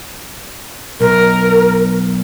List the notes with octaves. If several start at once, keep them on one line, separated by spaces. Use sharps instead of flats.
B1 A#4